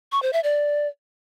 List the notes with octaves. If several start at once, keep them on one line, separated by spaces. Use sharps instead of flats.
C#6
C5
E5
D5